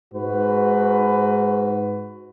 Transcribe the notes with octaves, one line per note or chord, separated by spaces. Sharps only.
G#2 F#4 B4